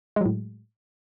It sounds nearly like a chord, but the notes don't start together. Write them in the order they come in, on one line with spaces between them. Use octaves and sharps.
G#3 F#3 A2